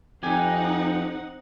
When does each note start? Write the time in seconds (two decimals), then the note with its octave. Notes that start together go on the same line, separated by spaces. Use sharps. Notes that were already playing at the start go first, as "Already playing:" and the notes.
0.23 F2 C4 D#4 G4 F#5 G#5